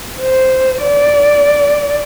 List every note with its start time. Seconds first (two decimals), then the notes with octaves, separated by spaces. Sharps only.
0.20 C5
0.82 D5